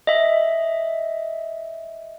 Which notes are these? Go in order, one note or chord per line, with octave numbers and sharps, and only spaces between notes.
D#5 E5